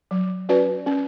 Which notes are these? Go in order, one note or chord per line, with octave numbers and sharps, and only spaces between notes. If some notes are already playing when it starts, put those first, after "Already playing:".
F#3
C#4 F#4 B4 D5
C#4